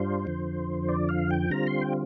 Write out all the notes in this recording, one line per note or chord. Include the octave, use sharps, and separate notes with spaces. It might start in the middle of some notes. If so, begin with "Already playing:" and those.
Already playing: G2 G3 D4 F4 C5
F2 D3 F3
D5
F5
G5
D3 G3 C4 F4 A#5
C6
G5